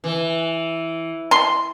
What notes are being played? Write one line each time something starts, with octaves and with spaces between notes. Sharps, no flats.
E3
C6